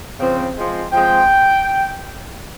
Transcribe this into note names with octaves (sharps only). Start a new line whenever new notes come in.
C#3 F3 C4
F3 G#3 C4
F3 G#3 C4 G5